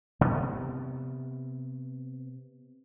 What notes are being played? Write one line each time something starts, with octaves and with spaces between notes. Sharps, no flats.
C3 B3